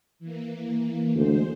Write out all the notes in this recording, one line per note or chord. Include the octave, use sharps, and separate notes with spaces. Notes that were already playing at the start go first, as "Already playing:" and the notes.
E3 A#3
D2 G#3 C5